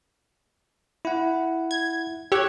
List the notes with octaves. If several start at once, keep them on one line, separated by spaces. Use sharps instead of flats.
E4 F#5
G#6
G4 C#5 E6 F#6 G#6